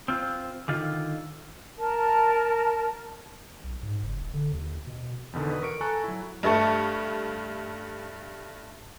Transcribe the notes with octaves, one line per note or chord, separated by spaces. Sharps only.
C4 F4
D3 D#3 F4
A#4 A5
B1
G#2
F#1
D1
D3
D#2
B2
E2 B2 D3 D#3
B4 D5 D#6
A#4 C#6 D7
A4 G#5 A#5 C#6 F#6
F#3 E4
G2 A3 E5 A5 C#6